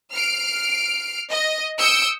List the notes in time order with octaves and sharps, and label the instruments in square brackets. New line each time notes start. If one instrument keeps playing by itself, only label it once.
[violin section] F6 C7 D7
D#5
D#6 E6 G6 C#7 D7